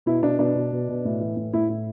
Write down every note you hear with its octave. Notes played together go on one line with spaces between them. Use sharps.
B2 E4
B2 D4
B2 D4
B2
B2
B2
A2
E3
A2
A2 E4
A2